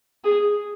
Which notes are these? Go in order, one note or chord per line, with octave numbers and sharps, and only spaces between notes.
G#4